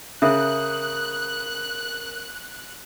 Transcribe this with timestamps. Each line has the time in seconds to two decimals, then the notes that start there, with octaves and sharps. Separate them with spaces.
0.22 C#3 A#4 E5 D#6 F#6 G6